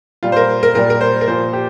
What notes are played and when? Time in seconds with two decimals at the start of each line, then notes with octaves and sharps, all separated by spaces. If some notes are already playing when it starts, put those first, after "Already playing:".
0.23 A#2 G3 F4
0.32 C5
0.36 A#4
0.63 A#4
0.75 A#2 G3 A#4
0.90 A#4
1.01 C5
1.21 A#4
1.27 A#2 F3 C5
1.53 G4